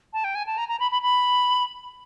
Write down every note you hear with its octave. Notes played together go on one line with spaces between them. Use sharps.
A5
G5
G#5
A5
A#5
A#5
B5
B5
B5